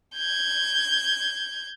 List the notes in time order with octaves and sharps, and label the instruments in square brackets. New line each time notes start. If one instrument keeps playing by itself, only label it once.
[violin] G6 G#6